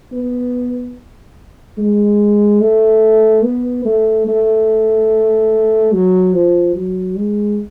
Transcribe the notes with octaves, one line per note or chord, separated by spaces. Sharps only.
B3
G#3
A3
B3
A3
A3
F#3
F3
F#3
G#3